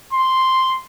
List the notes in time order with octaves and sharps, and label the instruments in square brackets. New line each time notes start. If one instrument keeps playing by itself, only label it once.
[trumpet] C6